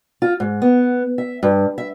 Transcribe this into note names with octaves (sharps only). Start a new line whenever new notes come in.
F4
G#2
B3
E5
G2
E5